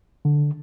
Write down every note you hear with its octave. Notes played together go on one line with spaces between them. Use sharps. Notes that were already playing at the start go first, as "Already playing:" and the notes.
D3